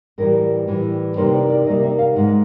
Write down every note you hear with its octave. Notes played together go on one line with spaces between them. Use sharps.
A2 E3 G3 A#4
A2 E3 G3
C3 D#3 G3 A#3 C5
D5
D5
C3 D#3 G3 A#3 D#5
E5
F5
G#2 D#3 G#3 F#5